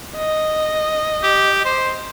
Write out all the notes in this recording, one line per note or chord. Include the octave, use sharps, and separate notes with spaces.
D#5
G4
C5